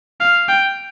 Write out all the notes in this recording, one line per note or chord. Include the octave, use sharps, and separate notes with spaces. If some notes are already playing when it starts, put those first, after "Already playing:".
F5
G5